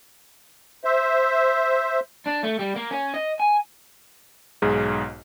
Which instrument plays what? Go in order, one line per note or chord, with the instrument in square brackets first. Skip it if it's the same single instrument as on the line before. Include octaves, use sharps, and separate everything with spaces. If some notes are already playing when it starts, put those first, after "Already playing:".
[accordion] C5 E5
[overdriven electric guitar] D4
A3
G3
A#3
C#4
D#5
G#5
[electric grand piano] B1 G#2 G#4